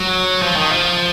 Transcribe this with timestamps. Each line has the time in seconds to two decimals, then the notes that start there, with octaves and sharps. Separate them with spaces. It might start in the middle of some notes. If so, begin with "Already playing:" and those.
Already playing: F#3
0.42 F3
0.56 D#3
0.72 F3